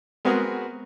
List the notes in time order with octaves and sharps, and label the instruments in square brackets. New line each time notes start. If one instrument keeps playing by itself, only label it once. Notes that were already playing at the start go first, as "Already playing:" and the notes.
[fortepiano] G#3 B3 C4 F#4 G#4 A#4